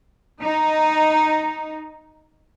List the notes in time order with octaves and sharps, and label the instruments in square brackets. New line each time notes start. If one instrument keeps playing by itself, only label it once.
[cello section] D#4